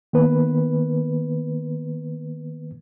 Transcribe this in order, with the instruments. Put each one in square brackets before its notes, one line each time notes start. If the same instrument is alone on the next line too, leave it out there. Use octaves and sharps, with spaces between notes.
[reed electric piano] D#3 A#3 B3 B4